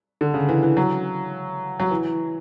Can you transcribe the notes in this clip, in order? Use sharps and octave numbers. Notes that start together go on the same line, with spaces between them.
D3
C#3
E3
E3
F#3
F#3
E3